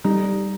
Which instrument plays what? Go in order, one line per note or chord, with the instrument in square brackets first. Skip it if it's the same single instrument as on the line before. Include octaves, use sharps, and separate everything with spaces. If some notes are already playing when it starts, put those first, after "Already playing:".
[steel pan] G3 [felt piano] D#4